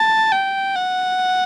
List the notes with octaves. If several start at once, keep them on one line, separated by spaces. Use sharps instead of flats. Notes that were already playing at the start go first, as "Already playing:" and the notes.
Already playing: A5
G5
F#5